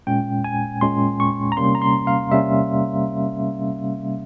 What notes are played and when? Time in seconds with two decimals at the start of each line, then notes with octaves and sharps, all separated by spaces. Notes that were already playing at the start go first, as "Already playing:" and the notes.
0.07 A#2 G#3 C#4 G5
0.44 G#5
0.81 A#2 G#3 C#4 C6
1.20 C#6
1.52 A#5
1.57 C3 G3 A#3 C#4 C6
1.75 A#5
1.82 C6
2.07 F5
2.31 C3 G3 A#3 C#4 E5